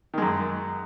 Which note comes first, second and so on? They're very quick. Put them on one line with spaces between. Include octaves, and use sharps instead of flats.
D#3 G#3 F#2